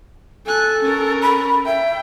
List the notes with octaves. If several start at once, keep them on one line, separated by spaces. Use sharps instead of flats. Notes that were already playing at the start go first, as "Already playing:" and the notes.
A4 G#5 F#6
C#4 A#4
B5
E5 G5